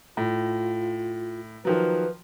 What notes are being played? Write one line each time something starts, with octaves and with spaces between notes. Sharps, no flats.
A2 F4
D#3 F3 F#3 B4